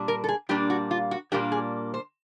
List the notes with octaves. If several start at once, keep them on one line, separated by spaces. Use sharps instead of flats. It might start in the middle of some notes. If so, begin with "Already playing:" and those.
Already playing: A#2 G3 D4
A#4
A4
G#4
A#2 G3 A#3 D4 G4
F#4
F4
F#4
A#2 G3 A#3 D4 G4
G#4
C5